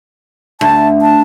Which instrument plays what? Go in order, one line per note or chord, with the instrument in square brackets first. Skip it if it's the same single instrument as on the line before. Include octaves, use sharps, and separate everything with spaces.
[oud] D2 [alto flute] A5
[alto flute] A5